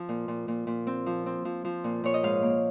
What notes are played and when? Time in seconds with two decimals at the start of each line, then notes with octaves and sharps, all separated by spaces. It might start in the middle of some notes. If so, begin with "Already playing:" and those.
Already playing: F3 C4
0.09 A#2
0.28 A#2
0.48 A#2
0.67 A#2
0.87 C4
1.06 F3
1.26 C4
1.45 F3
1.65 F3
1.84 A#2
2.04 A#2 C#5
2.14 D#5
2.23 G#2 F5
2.43 A#3